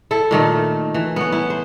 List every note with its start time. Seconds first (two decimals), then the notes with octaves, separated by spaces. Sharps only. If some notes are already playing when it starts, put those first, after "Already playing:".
0.11 E4 A4
0.31 A#2 D#3 A3
0.94 E3
1.16 B3 C#4
1.32 E4
1.50 C5